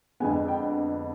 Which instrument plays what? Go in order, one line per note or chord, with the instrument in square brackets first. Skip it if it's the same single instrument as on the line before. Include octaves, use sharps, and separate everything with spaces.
[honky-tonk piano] F2 D3 G#3 B3 G#5
G5